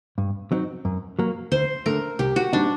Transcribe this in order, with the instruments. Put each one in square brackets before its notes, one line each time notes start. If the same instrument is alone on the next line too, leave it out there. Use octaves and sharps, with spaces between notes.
[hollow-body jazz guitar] G2
F#3 C4 D#4
F#2
F#3 A#3
[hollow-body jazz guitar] D2 [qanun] C5
[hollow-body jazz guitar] D3 A3 [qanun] A#4
[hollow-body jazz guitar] C2 [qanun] G4
[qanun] F#4
[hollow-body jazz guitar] A#2 G3 C4 D#4 [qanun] D4